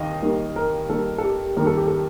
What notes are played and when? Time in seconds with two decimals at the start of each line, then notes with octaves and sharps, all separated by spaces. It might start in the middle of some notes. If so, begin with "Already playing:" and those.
Already playing: D#2 D#3 D#5 F5
0.23 D#2 D#3 G3
0.56 A#4
0.90 D#2 D#3 G3 A4
1.18 A4
1.24 G4
1.57 D#2 D#3 G3 A#4
1.67 A4
1.77 G4
1.87 A4